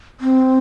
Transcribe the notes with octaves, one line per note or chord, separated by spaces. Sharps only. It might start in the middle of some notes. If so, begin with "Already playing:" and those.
C4